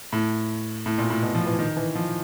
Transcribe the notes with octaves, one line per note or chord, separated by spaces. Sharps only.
A2
A2
A#2
A2
B2
F3
E3
D#3
E3
F3